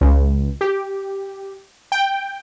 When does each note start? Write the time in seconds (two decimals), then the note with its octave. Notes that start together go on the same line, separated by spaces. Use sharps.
0.01 C#2
0.61 G4
1.92 G5